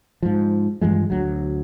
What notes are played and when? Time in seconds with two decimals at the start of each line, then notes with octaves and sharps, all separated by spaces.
0.23 G#2 F3
0.81 G2 E3 F3 G#3
1.10 D2 F#3